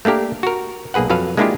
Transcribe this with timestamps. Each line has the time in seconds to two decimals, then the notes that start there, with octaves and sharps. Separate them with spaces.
0.05 A3 A#3 D4 G4 A#4
0.43 F#4 A#4
0.94 B1 A#3 G#4 B4 F#5
1.10 F2 F#3 A4 B4 F5
1.37 G#3 A#3 D4 E4 F4 G4